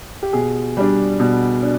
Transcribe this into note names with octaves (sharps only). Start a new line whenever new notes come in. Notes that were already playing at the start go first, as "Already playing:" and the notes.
G4
B2 G#4
G3 D4
B2
D4